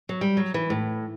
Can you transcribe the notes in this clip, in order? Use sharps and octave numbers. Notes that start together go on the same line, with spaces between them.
F#3
G3
F#3
E3
A2